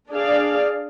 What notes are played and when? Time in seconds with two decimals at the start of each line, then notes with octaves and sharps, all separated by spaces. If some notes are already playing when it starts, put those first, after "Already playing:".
0.10 D4 G#4 D5 F5